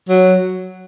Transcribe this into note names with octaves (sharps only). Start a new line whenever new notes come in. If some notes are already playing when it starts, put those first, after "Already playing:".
F#3